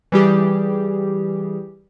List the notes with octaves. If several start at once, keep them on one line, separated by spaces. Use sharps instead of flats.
E3 G3 G4 G#4